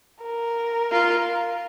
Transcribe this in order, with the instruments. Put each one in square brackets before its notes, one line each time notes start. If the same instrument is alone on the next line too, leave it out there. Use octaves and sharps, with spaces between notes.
[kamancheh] A#4
[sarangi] F4